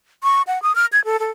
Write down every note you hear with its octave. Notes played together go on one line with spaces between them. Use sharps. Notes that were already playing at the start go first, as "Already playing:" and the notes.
C#6
F#5
D#6
F6
G#6
A4
A4